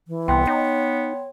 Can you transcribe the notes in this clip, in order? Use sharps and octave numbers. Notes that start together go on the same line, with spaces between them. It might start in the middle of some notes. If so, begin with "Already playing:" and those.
E3
C2 B3 G5 C6
D#4 C#5